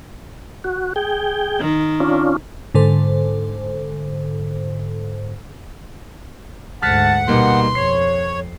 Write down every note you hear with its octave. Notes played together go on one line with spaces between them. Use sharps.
F#4
G#4 G5
D#3
C#4 D4 F4
G#2 D3 A4 C5
D2 G#2 F#5 A5 F6 F#6 B6
B2 G3 A#3 D#4 C6
F2 C#5 C7